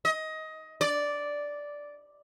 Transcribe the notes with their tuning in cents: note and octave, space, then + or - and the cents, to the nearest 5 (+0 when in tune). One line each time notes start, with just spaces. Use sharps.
D#5 +20
D5 -5